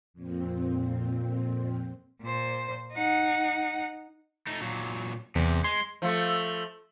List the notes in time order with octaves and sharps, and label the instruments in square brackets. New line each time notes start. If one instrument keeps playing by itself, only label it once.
[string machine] F2 A#2 C4
[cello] A#2 C5
D#4 F#5
[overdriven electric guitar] A3 D#4
A#2 F#3
[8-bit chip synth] E2 [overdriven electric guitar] C3
[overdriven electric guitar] G#3 [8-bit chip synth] C6
[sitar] F3 A3